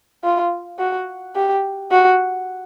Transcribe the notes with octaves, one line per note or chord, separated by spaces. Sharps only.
F4
F#4
G4
F#4